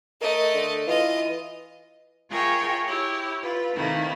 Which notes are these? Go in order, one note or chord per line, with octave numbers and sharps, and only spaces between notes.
A3 A#4 D#5
D3
E3 F4 D#5
F4 G#4 A#4 C#5 E5 G5
E4 G4 C#5
F4 B4
C3 D#3 A3 A#3 D#4 E4